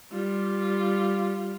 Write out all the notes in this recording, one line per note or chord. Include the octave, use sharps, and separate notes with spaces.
G3 F4